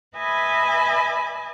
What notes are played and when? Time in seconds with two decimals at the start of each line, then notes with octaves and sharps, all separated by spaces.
0.15 B4 D#5 E5 G#5 A5 B5